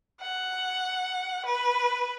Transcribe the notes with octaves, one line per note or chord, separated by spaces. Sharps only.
F#5
B4